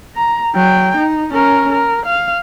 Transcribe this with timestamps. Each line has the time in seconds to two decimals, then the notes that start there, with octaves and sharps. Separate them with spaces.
0.16 A#5
0.54 F#3 G5
0.97 D#4
1.33 C#4 A#4
1.72 A#4
2.05 F5